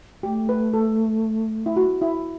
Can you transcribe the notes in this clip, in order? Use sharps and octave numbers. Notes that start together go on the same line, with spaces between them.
A3 G4
B4
A4
E4
F#4
E4